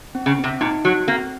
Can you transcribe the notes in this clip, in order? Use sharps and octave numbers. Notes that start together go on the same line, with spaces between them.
C4
C#3
C3 C4
A#2 D#4
F#3 F#4
A#3 C4